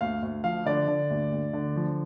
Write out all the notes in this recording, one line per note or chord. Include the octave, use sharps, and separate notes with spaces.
D2 F5
D2
F3 F5
D3 D5
D3
D2
D2
D3
F3